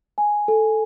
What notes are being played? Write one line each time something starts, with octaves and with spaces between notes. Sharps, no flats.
G#5
A4